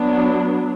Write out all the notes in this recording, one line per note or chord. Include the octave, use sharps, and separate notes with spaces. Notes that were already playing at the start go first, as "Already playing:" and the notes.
Already playing: F#3 B3 D4